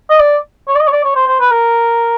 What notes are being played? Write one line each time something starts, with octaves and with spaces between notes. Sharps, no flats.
D#5
D5
C#5
D5
D#5
C#5
D5
C#5
C5
C5
B4
A#4